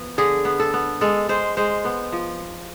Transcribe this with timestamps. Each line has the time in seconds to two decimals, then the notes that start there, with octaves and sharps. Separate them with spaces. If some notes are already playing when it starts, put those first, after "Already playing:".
Already playing: F3 B3
0.18 D3 G#4
0.45 B3
0.60 A4
0.74 B3
1.01 G#3 A4
1.29 G#3 C5
1.57 G#3 C5
1.85 B3
2.12 F3